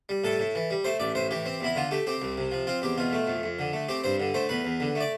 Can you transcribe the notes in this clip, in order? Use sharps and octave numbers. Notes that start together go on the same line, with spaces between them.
G3
A2 A4
A2
E3
G3
A3 C5
A1 D5
A2 C5
E3 G4
C4
E2 E4
D3 F4
A3 G4
C4 G4
C2
C3
F3
C4 F4
E2 G4
B2 F4
A3
F2
F2
D3
A3
C4 G4
G2 C5
D3
A3 C5
E2 B4
E2
D3
A3
D5